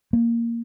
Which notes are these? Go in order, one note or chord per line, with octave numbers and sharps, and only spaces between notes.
A#3